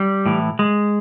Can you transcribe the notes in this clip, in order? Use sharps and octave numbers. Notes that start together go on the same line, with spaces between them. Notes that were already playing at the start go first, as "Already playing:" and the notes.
Already playing: G3
A2 E3
G#3